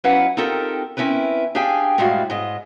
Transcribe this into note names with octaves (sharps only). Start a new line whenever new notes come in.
F#3 C#4 E4 B4 F5 F#5
C4 D#4 F4 G4 A4 A#4
C4 C#4 E4 A#4 B4
D4 G4 G#4 F5 G5 G#5
F#2 A2 G3 G#3 F#4 F5
G#2 D#5